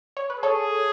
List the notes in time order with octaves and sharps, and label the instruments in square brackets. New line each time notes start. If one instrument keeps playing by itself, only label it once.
[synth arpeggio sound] C#5
B4
[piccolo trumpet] G#4 [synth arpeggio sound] A4 C#5